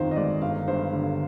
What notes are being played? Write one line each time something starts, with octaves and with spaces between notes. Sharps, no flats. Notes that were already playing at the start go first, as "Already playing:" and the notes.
Already playing: G1 F2 D#3 C5 F5
D#5
G#3 D5
G1 F5
G2 C5
D3